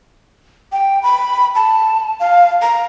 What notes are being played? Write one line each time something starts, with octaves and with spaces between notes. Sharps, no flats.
G5
B5
A5
F5
A#5